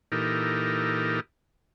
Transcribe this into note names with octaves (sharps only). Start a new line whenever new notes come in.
A#2 E3 D#4 G4 A4 A#4